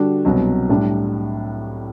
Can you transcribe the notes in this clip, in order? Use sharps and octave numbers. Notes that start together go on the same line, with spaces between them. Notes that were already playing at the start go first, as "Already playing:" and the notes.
Already playing: D3 G3 D4 F#4
C2 B2 F#3
A2 G3 D4